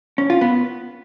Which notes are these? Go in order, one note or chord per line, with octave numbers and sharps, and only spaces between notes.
C#4
F4
B3